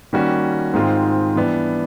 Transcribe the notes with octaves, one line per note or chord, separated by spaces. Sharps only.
D#3 G3 A#3 C#4 F#4
G#2 D#3 G#3 C4 F4
E3 G3 B3 D4